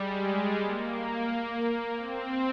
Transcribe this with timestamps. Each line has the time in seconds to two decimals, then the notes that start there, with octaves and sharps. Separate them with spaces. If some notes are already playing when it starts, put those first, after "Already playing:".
Already playing: G3 G#3
0.59 A#3
1.94 C4